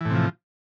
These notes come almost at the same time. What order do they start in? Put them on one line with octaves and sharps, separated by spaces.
E3 A2 C3 F3